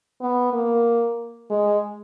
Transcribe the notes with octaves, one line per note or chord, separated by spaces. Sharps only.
B3
A#3
G#3